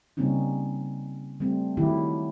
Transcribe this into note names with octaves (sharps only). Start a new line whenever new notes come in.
C#3 G3 A#3 C4 C#4 D#4
G3 A3 C4
D#3 F#3 A3 E4 G4